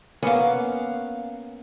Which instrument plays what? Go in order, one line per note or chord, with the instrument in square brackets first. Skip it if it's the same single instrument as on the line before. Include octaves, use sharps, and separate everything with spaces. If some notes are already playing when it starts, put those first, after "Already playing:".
[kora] A#3 B3 C#4 [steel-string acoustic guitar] F5 F#5